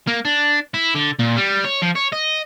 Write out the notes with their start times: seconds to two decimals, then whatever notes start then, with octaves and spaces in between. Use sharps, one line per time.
0.07 A#3
0.25 D4
0.74 E4
0.95 D3
1.19 A#2
1.37 G3
1.65 C#5
1.82 F3
1.96 C#5
2.13 D#5